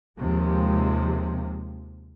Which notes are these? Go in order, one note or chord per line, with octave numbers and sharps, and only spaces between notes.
D#2 C3 F3 G#3